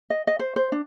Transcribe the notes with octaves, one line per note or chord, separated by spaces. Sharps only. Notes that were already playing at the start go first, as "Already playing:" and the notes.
D#5
D#5
C5
C5
D4